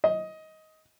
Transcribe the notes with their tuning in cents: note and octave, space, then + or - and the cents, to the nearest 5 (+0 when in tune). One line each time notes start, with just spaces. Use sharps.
D#5 +15